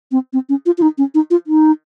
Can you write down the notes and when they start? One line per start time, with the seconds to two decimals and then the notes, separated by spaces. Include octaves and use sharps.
0.12 C4
0.33 C4
0.49 C#4
0.66 F4
0.78 F4
0.82 D#4
0.98 C#4
1.14 D#4
1.31 F4
1.47 D#4